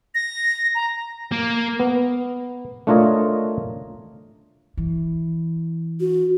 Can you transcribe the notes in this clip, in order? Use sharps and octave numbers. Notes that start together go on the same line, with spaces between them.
A#6
A#5
A#3
B3
A3 D4 F4 A#4 C#5 D#5
E3
F#4